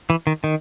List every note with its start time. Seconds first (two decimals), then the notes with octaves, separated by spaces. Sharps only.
0.10 E3
0.27 D#3
0.44 D#3